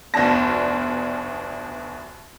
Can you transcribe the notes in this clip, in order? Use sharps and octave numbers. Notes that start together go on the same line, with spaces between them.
F1 D2 B2 D4 A5 A#6